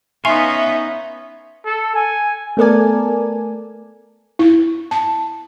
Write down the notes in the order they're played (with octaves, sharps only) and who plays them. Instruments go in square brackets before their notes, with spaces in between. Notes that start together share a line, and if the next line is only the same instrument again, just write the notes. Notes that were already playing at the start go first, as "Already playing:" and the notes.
[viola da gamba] B3 C#4 D#4 [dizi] E5 [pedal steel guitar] F5 C6 C#6 [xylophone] G#5
[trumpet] A4
G#5
[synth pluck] A3 B3 A4 A#4 D5 G#5
[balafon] E4
A5